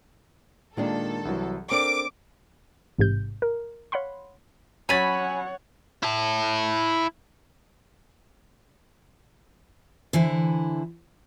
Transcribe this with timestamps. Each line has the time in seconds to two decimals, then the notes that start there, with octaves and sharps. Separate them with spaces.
0.77 A#2 D#3 G#3 A#3 D4 A4
1.25 C2 E3 F#3
1.71 C4 D4 A4 A#4 D6
2.98 A1 G#2 C3 G6
3.42 A#4
3.92 C#5 F5 F#5 B5 C6
4.89 F#3 C#4 C#5 F#5 G#5 B5 A6
6.03 E4 A5
10.13 D3 E3 E4 C5